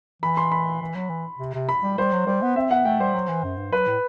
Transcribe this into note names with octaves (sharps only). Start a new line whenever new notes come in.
E3 B5
C6
B5
E3
F#3
E3
C3
C3
B5
G3
G3 C5
F#3
G3 C5
B3
C4 E5
B3 F#5
A3 G5
G3 C5
F#3
E3
F#2
G2
F#3 B4
A2